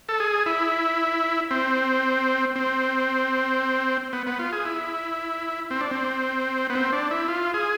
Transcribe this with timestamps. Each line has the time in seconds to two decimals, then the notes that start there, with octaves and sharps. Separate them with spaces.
0.09 A4
0.20 G#4
0.46 E4
1.51 C4
2.56 C4
4.13 B3
4.27 B3
4.39 F4
4.53 G#4
4.65 E4
5.70 C4
5.81 D4
5.91 C4
6.70 B3
6.75 C4
6.93 D4
7.11 E4
7.28 F4
7.54 G#4